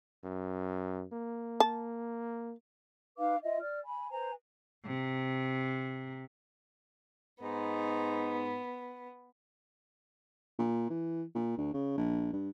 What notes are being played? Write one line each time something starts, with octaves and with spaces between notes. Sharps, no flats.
F#2
A#3
A5
D#4 B4 F5 D6
F4 D#5 E5
D5 F6
G#5 B5
B4 C5 G#5 A#5
C3
G#2 B3 D#4
A#2
E3
A#2
D2
C#3
A#1
G2